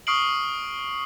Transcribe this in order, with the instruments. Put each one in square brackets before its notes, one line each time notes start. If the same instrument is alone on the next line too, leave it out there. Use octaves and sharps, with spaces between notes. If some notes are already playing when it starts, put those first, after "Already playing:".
[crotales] C#6 D#6 F6 C7 D7 F#7